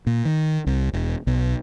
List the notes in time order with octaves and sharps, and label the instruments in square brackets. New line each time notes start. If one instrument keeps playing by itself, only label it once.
[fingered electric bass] A#2
D#3
C2
E1
B1